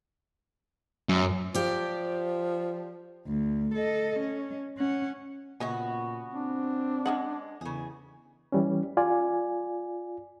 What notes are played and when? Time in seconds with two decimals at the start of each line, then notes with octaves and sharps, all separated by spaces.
1.09 F#2
1.55 F3 G4 D5
3.27 D2
3.74 A4 D#5
4.20 C#4
4.78 C#4 F#5
5.60 A#2 C#3 B3 F#4 D#5 G#5
6.34 C4 D4
7.06 G#3 C#4 D#5 F#5
7.61 E2 C#3 G#4
8.52 E3 G3 C#4
8.97 F4 D5 G#5